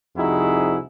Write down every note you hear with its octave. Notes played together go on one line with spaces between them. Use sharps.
C2 F2 D#4 E4 F#4 G#4